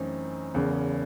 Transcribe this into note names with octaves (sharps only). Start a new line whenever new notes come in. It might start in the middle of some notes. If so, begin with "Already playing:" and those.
Already playing: F#2 E3 A3 C4 D#4
F#1 E2 C#3